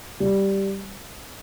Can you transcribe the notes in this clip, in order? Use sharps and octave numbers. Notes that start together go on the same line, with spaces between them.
G3